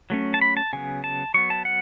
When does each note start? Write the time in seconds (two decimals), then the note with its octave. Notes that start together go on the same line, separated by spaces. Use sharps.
0.10 F#3 A3 C#4
0.34 A5
0.41 B5
0.57 A5
0.73 C#3 F#3 B3 G#5
1.04 A5
1.34 F#3 B3 C#6
1.50 A5
1.65 F#5